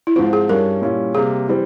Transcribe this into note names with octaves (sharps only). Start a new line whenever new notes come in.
E4
G#2 F3 C4 F4
G#4
G2 G3 C#4 A#4
A#2 G3 C#4 E4
C3 G3 A#3 G#4
E3 G3 C4